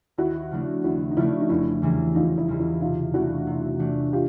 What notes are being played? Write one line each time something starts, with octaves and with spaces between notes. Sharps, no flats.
D#2 E4 F#4
C#3 F3 A3 D4
D#2 E4 F#4
D#4
C#3 F3 A3 D4 E4
D#4
F1 E4
E2 C#3 E3 G3
F1 D#4 F4
E4
E2 C#3 E3 G3
E4
C3 D#4 F4
E3 A3 D4 E4 F#4
C3
E3 A3 D4
F4 G4